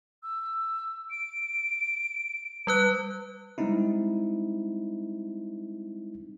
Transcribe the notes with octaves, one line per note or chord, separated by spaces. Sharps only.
E6
D7
G3 B4 F#6
G3 G#3 C4 D#4 E4